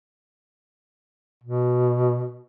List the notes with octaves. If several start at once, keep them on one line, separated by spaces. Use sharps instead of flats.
B2